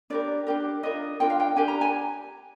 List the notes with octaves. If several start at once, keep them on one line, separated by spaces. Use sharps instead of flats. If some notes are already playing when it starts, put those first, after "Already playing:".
D4 G4 A#4 D5
D4 G4 A#4
D4 F4 A#4 D#5
D4 F4 A#4 G5
F5
G5
D4 G4 A#4 G#5
A#5
G#5